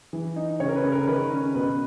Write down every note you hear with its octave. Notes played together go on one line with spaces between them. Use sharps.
E3
D#4
C#3 C#5
A#4
B4
C#3
A#4
D#3 B4
C#4
B2 B4